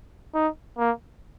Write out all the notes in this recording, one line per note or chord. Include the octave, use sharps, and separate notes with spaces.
D#4
A#3